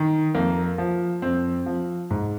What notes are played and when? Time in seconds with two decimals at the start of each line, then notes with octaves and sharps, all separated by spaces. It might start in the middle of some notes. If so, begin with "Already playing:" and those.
Already playing: D#3
0.34 F2 A#3
0.78 F3
1.22 F2 C4
1.66 F3
2.10 G#2